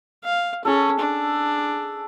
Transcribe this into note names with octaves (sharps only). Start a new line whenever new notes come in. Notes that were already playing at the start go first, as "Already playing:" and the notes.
F5
C#4 G#4 A4
D4